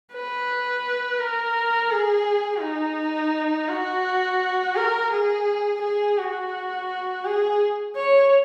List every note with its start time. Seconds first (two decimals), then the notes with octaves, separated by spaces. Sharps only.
0.13 B4
1.19 A#4
1.91 G#4
2.62 D#4
3.69 F#4
4.76 A#4
5.12 G#4
5.82 G#4
6.18 F#4
7.25 G#4
7.96 C#5